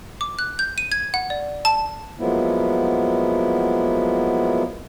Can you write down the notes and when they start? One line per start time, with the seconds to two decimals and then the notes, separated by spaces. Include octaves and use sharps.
0.21 D6
0.39 F#6
0.59 G6
0.78 D#7
0.92 G#6
1.14 F#5
1.30 D5
1.65 A5
2.19 F3 F#3 G#3 A#3 B3 E4